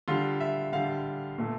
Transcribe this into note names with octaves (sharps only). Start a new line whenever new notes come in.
D3 G3 F4
E5
D3 G3 F5
A#2 A3